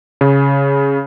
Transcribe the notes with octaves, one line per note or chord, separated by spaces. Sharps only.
C#3